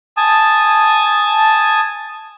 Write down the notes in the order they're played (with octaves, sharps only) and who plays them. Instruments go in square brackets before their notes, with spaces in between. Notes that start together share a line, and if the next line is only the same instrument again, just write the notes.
[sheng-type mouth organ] G#5 A5 D#6